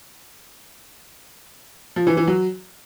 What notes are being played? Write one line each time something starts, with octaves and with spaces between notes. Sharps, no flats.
F3
E3
E3
F#3